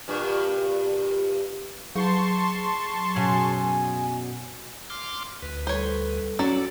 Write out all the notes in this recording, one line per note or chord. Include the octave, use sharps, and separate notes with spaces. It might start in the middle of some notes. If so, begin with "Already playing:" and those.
G2 A#2
F#3 G#4 A5 C6 C#6
F#2 B2 G#5
C6 D6 F6
D2 B4
G3 A4 C5 C#5
F#3 C#4 F#4 A4 D5